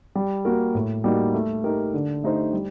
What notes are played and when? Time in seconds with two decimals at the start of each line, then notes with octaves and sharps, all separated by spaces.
0.15 G3
0.45 A#3 F#4 A#4
0.75 A2
1.04 G3 A#3 D#4 F#4
1.34 A3
1.64 D#4 G4 A#4
1.94 D3
2.24 A3 D#4 G4 C5
2.53 G3